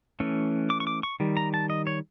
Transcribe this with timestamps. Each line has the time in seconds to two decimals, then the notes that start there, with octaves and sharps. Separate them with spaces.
0.20 E3 A3 C#4
0.70 D6
0.80 C#6
0.87 D6
1.03 C#6
1.20 D#3 G3
1.37 A#5
1.54 A5
1.70 D#5
1.87 C#5